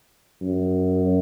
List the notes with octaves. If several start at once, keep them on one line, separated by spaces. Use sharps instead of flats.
F#2